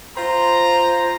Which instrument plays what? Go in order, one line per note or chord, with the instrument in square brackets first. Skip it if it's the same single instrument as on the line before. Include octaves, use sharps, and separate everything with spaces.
[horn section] F4 C5 A#5